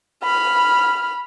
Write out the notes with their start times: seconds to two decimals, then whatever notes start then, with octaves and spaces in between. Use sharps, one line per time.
0.24 B5 F6